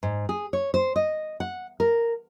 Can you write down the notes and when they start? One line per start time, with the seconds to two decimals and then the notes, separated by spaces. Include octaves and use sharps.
0.03 G#2
0.29 G#4
0.53 C#5
0.74 C5
0.96 D#5
1.40 F#5
1.80 A#4